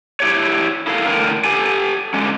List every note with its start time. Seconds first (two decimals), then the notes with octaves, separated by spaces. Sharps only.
0.20 E4 G4 C#5
0.87 E4 A4 A#4 F5
1.07 A2 D3 A#4
1.44 G4 A4 G#5
2.14 D3 G#3 C#4